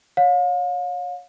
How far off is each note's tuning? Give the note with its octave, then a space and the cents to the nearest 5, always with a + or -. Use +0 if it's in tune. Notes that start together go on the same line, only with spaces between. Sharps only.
C#5 +10 F5 +40